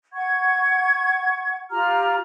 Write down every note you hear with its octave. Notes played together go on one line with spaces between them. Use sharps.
F#5 C#6 G#6
F4 G4 A#5 F6